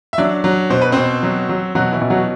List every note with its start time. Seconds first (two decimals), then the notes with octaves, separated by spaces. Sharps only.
0.13 E5
0.18 F#3 D4 D5
0.44 F#3
0.70 B2 C5
0.81 B4
0.92 B2 C4 C5
1.23 F#3
1.49 F#3
1.75 B2 F#3 F#4
1.92 E3 E4
2.02 B2
2.10 F#3 F#4